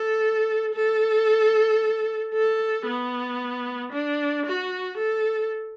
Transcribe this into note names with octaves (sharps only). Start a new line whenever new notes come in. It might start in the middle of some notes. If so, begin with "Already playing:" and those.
Already playing: A4
A4
A4
B3
D4
F#4
A4